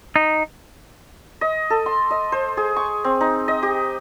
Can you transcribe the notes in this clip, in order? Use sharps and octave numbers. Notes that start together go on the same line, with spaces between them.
D#4
D#5
A4
C6
D#5
C5
G#4
C#6
C4
D#4
D#5
G4